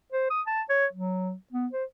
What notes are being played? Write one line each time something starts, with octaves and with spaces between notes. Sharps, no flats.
C5
D#6
A5
C#5
F#3
B3
C5